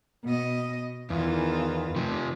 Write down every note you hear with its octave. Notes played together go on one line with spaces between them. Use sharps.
B2 D#5
E2 D#3 E3 F4
C3 F3